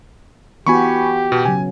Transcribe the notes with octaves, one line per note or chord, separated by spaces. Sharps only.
E3 B3 F#4 G4 G#5 B5 C#6
B2
C#3 F#3 G#5